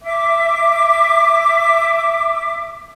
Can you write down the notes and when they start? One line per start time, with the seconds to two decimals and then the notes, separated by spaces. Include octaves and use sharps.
0.02 E5 D6